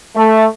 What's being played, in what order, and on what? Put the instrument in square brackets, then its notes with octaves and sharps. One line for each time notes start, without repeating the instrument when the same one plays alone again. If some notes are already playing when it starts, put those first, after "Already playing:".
[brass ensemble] A3